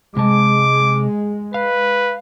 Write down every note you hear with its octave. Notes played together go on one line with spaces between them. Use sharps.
C3 G#3 A5 D6
B4 F5